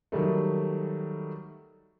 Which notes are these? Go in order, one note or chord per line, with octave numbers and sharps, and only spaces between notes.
D#3 F#3 G3 A3